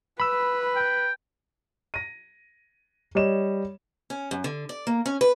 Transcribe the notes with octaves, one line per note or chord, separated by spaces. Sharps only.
B4 B5 E6
G5
A#6 D#7
G3 C#5 D#5 E7
C#4
F#2
D3
D5
A#3
C#4
B4